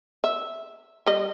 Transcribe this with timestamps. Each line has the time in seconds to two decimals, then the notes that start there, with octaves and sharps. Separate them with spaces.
0.24 E5
1.06 G3 D#5